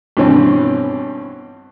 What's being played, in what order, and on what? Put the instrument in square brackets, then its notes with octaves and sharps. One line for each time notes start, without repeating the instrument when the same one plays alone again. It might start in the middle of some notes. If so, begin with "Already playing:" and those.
[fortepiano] G2 B2 E3 C4 C#4